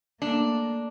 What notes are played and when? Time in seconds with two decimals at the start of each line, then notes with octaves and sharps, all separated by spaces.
0.22 A3 A#3 D4